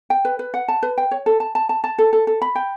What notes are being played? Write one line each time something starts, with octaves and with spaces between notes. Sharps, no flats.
G5
B4
B4
F#5
A5
B4
G5
C#5
A4
A5
A5
A5
A5
A4
A4
A4
B5
G5